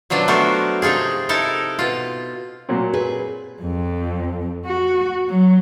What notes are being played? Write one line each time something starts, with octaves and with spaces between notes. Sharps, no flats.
B2 F3 F#3 D4
A3 B3 F#4 A4 A#4 C5
C3 F3 D#4 F4 G#4
D#4 E4 A4 A#4
B2 F4
A#2 F#3 C4
G#4 B4
F2
F#4
F#3